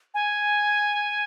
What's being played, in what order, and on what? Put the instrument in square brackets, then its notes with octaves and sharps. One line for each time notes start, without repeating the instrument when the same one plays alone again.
[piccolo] G#5